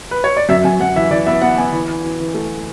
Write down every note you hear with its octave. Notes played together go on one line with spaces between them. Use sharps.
B4
C#5
D5
F#2 E5
F#2 G#5
F#2 F#5
E3 E5
E3 D5
B3 E5
B3 F#5
B3 G#5
E3
E3
E3
E3
A3